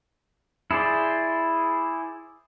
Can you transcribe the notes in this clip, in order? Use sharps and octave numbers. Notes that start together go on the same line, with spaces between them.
E4 G#4 C5 D5